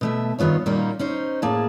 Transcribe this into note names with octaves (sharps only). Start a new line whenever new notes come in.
B2 A3 E5
G2 D#3 B3 F4 C#5
A#2 G3 A#3 C#4 D#4 F#4
C#4 D#4 C5
A2 A#3 G#4 A5